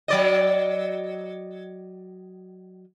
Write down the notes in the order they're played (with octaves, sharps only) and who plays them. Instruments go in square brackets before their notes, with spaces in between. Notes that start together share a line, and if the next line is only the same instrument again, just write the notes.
[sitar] F#3 D5 D#5